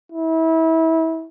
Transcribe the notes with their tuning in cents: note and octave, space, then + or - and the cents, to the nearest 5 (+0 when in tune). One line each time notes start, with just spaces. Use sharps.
E4 -30